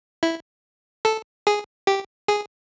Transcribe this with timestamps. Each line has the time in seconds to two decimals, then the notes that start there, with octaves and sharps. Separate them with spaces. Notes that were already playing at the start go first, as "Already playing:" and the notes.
0.23 E4
1.05 A4
1.47 G#4
1.87 G4
2.28 G#4